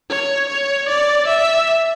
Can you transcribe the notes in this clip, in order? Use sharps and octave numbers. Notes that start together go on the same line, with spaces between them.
C#5
C#5
D5
E5